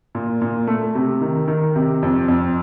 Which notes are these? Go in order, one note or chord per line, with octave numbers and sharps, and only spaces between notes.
A#2
A#2
A3
C3
D#3
D#3
C3
F2
F2